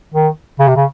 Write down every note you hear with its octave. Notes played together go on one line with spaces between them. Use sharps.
D#3
C#3
C3
C#3